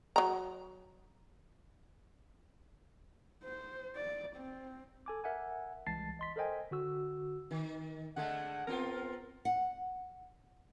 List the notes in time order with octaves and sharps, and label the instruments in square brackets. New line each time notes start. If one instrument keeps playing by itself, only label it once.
[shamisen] F#3 A#5
[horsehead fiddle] C5
D5
C4
[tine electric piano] A4 G#5 D6
A#4 E5 F#5 G#5
C2 E3 G#3 A5 A6 C7
D#5 C6 B6
A4 A#4 C5 D#5 G5 G#5
D3 F#4 E6
[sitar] D#3
[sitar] D3 G#3 A3 [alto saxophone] F#5
[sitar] B3 C4 F4 [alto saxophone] A#4
[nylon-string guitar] F#5